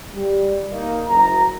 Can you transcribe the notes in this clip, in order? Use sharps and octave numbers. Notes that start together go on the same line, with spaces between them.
G3
A#3 D#4
F#1 A#5